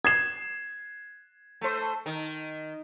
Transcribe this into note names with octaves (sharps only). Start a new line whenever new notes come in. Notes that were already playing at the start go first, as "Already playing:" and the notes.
G#6 C7 E7
A3 C5
D#3